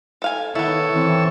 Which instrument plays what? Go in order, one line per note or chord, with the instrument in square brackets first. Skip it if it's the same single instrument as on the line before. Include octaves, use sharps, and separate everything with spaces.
[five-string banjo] A4 F5 G#5
[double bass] D#3 [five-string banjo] B3 E4 [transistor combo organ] A4 C#5 E6
[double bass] E3 C4